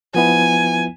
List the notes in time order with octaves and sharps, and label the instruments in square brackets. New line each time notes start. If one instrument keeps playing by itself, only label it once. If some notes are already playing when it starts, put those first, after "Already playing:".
[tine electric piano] F3 B3 E4 [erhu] G#5